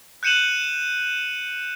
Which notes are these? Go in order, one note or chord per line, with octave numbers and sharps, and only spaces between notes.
F#6 G6 C#7 D#7 E7 F#7